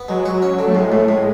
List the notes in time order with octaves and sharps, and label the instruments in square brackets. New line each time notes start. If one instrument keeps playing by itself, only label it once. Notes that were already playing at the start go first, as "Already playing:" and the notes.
Already playing: [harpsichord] B3
[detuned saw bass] F#3 [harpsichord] G#3
[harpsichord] F#4
C#4
D3
[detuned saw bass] A3
[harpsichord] A2 [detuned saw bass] G#3
[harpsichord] A2 [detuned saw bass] A3
[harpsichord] A2 [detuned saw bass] G#3